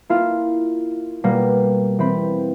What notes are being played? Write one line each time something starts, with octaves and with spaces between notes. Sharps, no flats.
A#3 E4 F4 F5
B2 G3 A#3
E3 C4 B5 C6